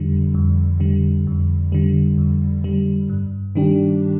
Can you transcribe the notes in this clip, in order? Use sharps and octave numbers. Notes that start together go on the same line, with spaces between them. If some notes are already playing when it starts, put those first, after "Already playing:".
Already playing: F2 D3 G3
F2
D3 G3
F2
D3 G3
F2
D3 G3
G2
D#3 G3 D4 G4